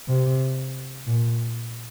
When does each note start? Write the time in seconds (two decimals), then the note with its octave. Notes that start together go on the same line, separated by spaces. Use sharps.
0.09 C3
1.07 A#2